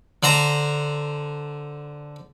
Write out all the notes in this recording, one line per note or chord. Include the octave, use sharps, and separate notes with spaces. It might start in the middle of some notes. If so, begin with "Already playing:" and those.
D3 C5 A#5